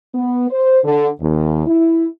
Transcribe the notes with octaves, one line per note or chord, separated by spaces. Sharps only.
B3
C5
D3
D#2
E4